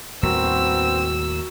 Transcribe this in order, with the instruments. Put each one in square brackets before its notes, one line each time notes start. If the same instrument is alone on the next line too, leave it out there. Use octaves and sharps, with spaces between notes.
[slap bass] D#2 A2 G3 [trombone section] B3 C4 [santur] F#4 A#4 [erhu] E6